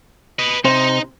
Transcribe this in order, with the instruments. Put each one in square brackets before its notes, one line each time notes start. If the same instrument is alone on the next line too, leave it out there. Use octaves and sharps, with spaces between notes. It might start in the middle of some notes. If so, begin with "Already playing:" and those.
[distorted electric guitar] B4 D#5
[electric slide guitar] C3 C5 [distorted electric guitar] D#4